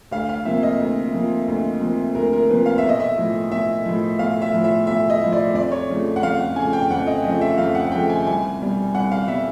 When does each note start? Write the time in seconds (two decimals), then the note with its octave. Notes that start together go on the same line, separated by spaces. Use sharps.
0.11 D2 F5
0.29 F5
0.45 C3 F3 A#3 E5
0.63 D#5
0.80 D2
1.13 C3 F3 A#3
1.48 D2
1.81 C3 F3 A#3
2.15 D2 A#4
2.33 A#4
2.49 C3 F3 A#3 B4
2.66 F5
2.78 B1 E5
2.89 D#5
3.00 E5
3.18 A2 F3
3.51 B1 E5
3.86 A2 F3
4.19 B1 F5
4.42 E5
4.53 A2 F3
4.64 E5
4.87 B1 E5
5.10 D#5
5.22 A2 F3
5.32 D5
5.54 F2 D5
5.72 C#5
5.89 C#3 F3 A3
6.16 F#5
6.22 F2 F5
6.40 F#5
6.56 C#3 F3 A3 G#5
6.73 G5
6.91 F2 F#5
7.07 D#5
7.24 C#3 F3 A3 D#5
7.41 E5
7.58 F2 F5
7.75 F#5
7.86 F#5
7.92 C#3 F3 A3 G5
8.09 G#5
8.27 C2 G#5
8.60 B2 G3
8.95 C2 F#5
9.12 F5
9.28 B2 G3 E5